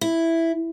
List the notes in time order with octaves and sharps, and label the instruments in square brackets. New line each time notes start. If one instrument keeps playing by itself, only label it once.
[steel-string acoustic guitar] E4